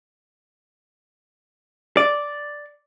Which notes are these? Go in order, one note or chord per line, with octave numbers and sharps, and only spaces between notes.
D5